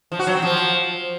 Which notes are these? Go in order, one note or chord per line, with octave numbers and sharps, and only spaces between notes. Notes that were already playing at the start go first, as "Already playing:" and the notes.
F3
F#4
F#3
C4
F3